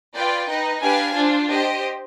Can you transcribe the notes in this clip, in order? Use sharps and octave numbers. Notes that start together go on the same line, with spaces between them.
F4 B4 D5 G5
D#4 B4 D#5
D4 G4 B4 F5 G#5
D4 F4 C5
G4 C5 D#5